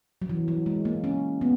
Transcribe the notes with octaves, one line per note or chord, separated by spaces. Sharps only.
F#3
E3
F#3
G#3
A#3
C#4
B3